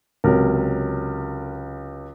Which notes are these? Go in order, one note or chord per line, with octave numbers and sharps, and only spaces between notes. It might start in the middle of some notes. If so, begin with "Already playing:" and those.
C#2 C3 F#3 A#4